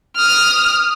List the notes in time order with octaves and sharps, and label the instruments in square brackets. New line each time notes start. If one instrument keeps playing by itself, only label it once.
[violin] D#6 F6